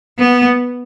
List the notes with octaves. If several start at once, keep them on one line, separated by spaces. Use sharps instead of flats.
B3